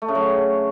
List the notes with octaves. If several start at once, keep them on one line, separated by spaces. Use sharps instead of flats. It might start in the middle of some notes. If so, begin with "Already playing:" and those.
A3
C#3
F#3